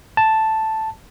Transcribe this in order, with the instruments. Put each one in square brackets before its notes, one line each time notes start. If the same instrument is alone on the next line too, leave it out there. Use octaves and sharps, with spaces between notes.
[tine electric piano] A5